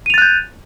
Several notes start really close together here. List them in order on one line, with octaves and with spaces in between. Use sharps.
D#7 F7 A6 F#6 G6